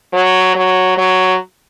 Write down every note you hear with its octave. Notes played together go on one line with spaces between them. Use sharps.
F#3
F#3
F#3